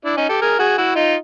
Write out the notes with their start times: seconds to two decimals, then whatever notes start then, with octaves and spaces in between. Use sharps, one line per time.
0.05 D4 E4
0.17 C#4 D#4
0.29 G4 A4
0.41 G#4 A#4
0.59 F#4 G#4
0.78 E4 F#4
0.95 D#4 F4